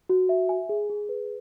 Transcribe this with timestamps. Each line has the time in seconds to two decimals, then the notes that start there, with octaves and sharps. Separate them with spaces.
0.09 F#4
0.29 E5
0.49 G#5
0.69 G#4
0.89 G#4
1.09 B4